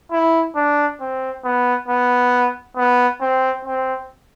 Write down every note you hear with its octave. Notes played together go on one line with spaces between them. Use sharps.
E4
D4
C4
B3
B3
B3
C4
C4